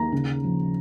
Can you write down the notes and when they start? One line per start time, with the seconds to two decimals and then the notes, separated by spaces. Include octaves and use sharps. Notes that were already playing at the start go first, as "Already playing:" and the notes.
Already playing: D#2 A#5
0.12 C#3
0.44 F3